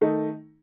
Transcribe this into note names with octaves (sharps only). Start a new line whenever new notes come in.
D#3 A3 D#4